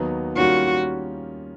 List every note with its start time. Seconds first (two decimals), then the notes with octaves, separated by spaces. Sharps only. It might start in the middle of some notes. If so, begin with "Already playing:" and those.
Already playing: D#2 D#3 F#3 B3 D#4
0.37 D#3 G3 A#3 C#4 F4 F#4